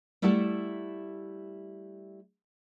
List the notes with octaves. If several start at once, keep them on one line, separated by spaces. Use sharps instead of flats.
G3 A3 E4 G4 A4 F#5